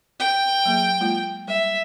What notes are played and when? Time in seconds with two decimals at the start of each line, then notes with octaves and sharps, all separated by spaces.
0.19 G5
0.65 F#3 A#3 G#4
1.00 G#3 A#3 F4
1.48 G3 E5